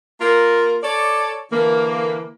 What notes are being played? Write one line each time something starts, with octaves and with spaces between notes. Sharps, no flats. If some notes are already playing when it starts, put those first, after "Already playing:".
A#3 F4 A#4
A4 C#5 D5
D3 E3 A#3